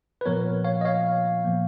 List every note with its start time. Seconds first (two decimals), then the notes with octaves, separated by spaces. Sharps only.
0.21 B4
0.26 A#2 F3 B3 A#4 C#5
0.65 C#5 F5
0.81 D#5
0.85 C#5 F5
1.44 A#2 F3 A#3